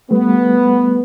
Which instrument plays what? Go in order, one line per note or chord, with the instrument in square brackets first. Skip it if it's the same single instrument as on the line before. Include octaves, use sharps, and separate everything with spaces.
[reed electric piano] G3 A3 [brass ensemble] B3